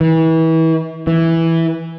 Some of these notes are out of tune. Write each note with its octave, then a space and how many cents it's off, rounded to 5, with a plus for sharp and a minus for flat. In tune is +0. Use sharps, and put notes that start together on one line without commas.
E3 -30
E3 -5